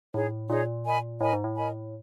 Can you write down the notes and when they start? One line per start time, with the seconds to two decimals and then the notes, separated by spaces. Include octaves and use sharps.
0.14 A2 D#4 G#4 C#5
0.49 A#2 D#4 G#4 C#5
0.85 A#4 D#5 G#5 B5
1.21 A2 A#4 D#5 G#5 B5
1.33 G#2
1.44 A2
1.56 A#4 D#5 G#5 B5